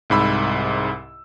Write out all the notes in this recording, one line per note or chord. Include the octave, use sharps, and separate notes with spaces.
C2 G#2 B5 E6